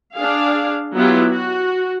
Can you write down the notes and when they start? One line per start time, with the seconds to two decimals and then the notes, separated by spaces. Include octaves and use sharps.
0.15 D4 G#4 F5
0.95 F#3 B3 E4 F4 G4
1.31 F#4